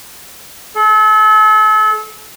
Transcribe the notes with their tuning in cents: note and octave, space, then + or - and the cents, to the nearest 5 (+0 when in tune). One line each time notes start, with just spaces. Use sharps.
A4 -35